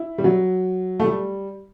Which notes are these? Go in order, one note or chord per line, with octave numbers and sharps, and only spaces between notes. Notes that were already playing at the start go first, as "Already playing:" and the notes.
Already playing: E4
G3
F#3
A3
G3